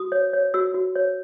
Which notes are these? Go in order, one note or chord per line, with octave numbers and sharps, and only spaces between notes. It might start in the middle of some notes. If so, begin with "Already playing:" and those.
Already playing: F#4 D#6
C#5
C#5
F#4 E6
F#4
C#5